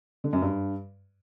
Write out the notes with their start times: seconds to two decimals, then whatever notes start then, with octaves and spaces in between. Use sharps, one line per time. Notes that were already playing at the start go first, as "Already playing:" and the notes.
0.24 D3
0.33 F#2
0.42 G2